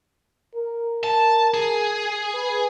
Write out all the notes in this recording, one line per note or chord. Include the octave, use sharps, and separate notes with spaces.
A#4
A5
G#4
B4